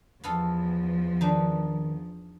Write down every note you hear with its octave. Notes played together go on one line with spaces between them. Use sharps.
E2 F3 B3 F4 A4
D#3 D4 D#4